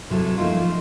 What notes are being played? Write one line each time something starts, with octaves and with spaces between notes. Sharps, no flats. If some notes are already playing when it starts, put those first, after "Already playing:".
C3 F#3 E4 A4
F3 A3 A#3 D#4 F4